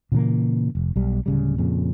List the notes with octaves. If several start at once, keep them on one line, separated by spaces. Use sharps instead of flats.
A#2 C#3 E3 A#3
F1
B1 G3
D1 C#3 G3
F2 A#2 C#3